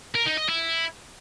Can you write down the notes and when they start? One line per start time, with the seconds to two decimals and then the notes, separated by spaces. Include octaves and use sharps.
0.15 A#4
0.27 D#4
0.38 D#5
0.49 E4